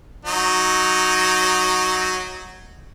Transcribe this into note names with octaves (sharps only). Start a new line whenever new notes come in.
F#3 D#4